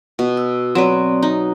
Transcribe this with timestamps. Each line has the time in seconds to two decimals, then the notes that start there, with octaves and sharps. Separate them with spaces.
0.19 B2
0.37 E6
0.75 F#3 C4 B4 D5
1.23 D#4